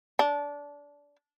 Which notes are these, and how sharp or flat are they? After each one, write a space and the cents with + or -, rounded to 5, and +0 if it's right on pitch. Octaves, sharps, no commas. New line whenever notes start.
D4 -20